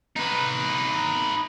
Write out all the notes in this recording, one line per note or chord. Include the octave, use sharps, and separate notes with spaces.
D#4 B4